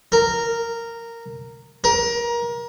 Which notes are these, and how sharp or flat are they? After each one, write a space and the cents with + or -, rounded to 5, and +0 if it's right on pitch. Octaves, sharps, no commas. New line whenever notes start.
A#4 -10
A#4 +25